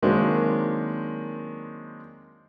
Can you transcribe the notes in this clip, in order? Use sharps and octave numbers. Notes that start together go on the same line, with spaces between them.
D#3 F#3 G#3 A#3 C4 D4